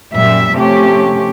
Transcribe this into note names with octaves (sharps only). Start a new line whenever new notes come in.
F#2 A#2 G3 E5
C3 F3 A3 C#4 G4